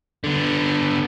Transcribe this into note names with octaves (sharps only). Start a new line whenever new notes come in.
D3 B3